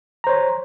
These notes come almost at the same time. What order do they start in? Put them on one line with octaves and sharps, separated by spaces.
A#5 C5 C#5